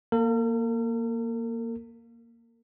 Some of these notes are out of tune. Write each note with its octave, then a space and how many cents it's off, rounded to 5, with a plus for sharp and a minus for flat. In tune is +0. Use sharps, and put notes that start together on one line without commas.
A#3 +0 A#4 -45